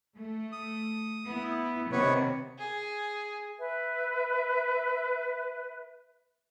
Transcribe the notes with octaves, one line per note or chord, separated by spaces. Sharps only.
A3
D#6
B3 E4
C3 D#3 B3 B4 C#5
G#4
B4 E5